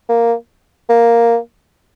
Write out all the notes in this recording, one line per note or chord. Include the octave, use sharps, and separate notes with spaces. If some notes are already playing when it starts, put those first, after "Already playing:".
A#3
A#3